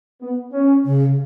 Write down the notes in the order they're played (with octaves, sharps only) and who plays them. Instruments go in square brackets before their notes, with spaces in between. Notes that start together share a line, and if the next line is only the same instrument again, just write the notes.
[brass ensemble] B3
C#4
[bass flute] C#3